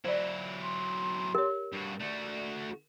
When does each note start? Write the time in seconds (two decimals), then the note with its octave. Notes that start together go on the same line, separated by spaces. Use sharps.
0.05 F#3 E4 C5 D5
0.63 C6
1.35 G4 A#4 C#5
1.73 G2 F#4
2.00 A3 F#4 D5